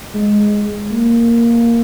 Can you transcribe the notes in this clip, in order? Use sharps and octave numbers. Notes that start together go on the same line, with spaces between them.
G#3
A#3